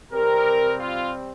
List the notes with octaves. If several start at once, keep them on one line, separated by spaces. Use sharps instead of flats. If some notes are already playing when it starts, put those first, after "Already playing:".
C3 G3 C4 G4 A#4
F4